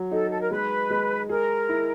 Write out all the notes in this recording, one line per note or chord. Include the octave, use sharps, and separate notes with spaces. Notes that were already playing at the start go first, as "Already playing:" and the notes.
Already playing: F#3
D#4 A4
A4
A#4
G#3 B4
G#3
G#4 A#4
E4